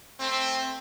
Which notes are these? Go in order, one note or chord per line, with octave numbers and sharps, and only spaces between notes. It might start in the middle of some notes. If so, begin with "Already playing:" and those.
A3 C4